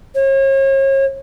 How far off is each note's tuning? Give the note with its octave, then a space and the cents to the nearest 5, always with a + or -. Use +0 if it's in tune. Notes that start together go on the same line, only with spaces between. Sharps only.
C#5 -40